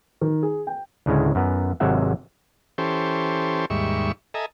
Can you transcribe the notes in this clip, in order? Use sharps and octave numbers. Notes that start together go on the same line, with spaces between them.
D#3
G#4
G5
D2 A2 C#3 G#3
F#2 B3
G#1 C3 F#3 G#3 E5 F#5
E3 C#4 G4 A4 C5
D#2 G#2 G3 E5 C#6
A4 D#5 E5 G#5 A#5